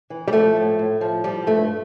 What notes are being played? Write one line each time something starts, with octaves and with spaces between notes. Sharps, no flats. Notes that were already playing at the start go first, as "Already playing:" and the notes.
E3
G3
F3 A3
A2
A2
F3
F3 G3
G2 A3